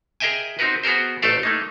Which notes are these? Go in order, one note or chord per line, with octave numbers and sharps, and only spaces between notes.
G#4 A#4 D#5 E5 G5 G#5
C4 D#4 F#4 A#4 B4
B3 F#4 G#4 A#4 C5
A1 A3 A4 C5 D5 F5
A3 A#3 D#4